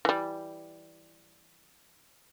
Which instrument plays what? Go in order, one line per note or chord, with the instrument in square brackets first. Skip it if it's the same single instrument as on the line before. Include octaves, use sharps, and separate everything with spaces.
[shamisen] E3 G3